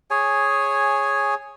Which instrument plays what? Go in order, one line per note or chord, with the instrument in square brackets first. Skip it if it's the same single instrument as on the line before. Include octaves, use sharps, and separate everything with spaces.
[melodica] G#4 C#5 G#5